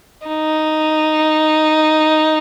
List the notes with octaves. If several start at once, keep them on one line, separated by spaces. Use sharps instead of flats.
D#4